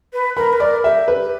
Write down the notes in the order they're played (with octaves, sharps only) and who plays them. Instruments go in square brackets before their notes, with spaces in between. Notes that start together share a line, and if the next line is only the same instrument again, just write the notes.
[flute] B4
[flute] A#4 [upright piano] B5
[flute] B4
[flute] A#4 [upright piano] D5
[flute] G4 [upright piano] E5
[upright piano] B4
[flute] G4